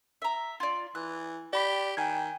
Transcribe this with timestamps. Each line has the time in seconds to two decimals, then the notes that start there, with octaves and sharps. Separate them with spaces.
0.22 E5 A#5
0.60 F4 D5
0.95 E3 F#6
1.53 G4 D5 B5 B6
1.97 D#3 G5 G#5 G#6